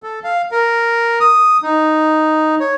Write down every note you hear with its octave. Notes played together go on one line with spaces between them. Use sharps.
A4
F5
A#4
D#6
D#4
C#5